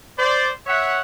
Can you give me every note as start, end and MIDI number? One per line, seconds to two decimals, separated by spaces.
0.19 0.49 72
0.19 0.49 74
0.67 1.00 73
0.67 1.00 76
0.67 1.00 78